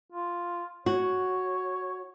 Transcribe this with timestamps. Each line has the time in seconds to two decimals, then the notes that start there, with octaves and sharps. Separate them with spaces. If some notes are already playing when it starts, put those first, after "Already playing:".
0.13 F4
0.86 F#4 C#5